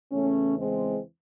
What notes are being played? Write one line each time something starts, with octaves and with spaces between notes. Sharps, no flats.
E2 C#3 E3 A3 C#4
G#3 C4